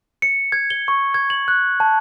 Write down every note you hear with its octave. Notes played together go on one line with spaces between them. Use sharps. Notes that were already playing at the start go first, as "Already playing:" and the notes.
C#7
G#6
G7
C#6
G#6
F#7
F#6
A5